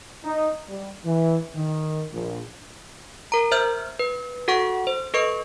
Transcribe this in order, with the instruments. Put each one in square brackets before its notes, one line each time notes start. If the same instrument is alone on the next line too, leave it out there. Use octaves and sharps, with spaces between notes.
[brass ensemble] D#4
G3
E3
D#3
A#1
[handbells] A#4 A#5
C5 E5 F6 G6
B4
F#4 A4 F#5 C#6
C5
A4 B4 D#5 C#6